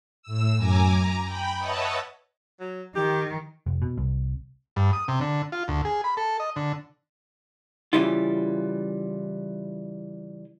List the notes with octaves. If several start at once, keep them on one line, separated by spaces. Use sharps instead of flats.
A2 E6
F#2 G#5 A#5 D6
A#5
G5 B5
B4 C#5 D#5 E5 F#5 A5
F#3
D#3 G4
F1
B2
C2
G2
D#6
C3
D3
F4
D2
G#4
B5
A4
D#5
D3
C#3 E3 G3 E4 F4